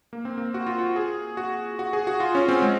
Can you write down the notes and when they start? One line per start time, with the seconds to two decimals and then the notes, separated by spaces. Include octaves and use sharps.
0.13 A#3
0.25 C4
0.38 A#3
0.54 F#4
0.66 F4
0.78 F#4
0.96 G#4
1.37 F#4
1.79 F#4
1.93 G#4
2.07 F#4
2.20 F4
2.35 C#4
2.48 C4
2.62 G#3